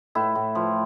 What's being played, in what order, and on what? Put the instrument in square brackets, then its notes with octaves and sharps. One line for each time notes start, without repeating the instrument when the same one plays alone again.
[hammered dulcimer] A2 E4
A2
F3